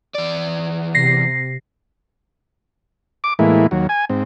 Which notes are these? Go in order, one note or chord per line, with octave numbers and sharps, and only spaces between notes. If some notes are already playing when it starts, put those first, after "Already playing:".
E2 D5
C3 A#6 C7
D6
A2 E3 G#3 A#3 E4
D#2 F#3
G#5
G#2 C4